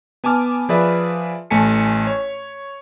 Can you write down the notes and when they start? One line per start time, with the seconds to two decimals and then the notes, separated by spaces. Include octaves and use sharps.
0.24 B3 G#5 A5 D6 F6
0.69 F3 G#4 B4 D5 E5
1.51 A1 A3 G#5 A5 B6 C#7
2.07 C#5